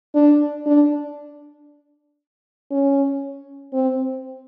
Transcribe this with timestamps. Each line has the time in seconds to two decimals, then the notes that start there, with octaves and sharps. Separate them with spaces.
0.15 D4
0.66 D4
2.71 C#4
3.73 C4